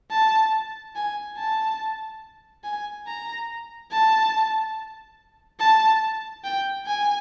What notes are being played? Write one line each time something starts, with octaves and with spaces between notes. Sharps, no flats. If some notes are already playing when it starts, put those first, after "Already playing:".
A5
G#5
A5
G#5
A#5
A5
A5
G5
G#5